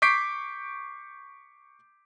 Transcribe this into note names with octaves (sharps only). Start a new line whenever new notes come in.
C#6 D6 G6 B6 C7 D7